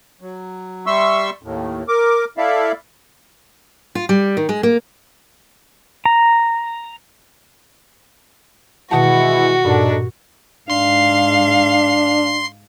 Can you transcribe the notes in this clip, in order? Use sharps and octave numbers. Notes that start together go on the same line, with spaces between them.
F#3
G3 E5 C6 C#6 E6
D#2 A2
A#4 D6
E4 A4 D5 E5 F5
F4
G3
D#3
G#3
A#3
A#5
B2 D#3 E3 G#3 E4 F#4 F#5 A5
G2 A#2 D4 D#4 A4
G#2 D4 F5 C6 C7